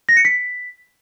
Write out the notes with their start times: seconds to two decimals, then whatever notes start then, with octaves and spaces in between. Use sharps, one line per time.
0.09 A#6
0.17 C#7
0.25 B6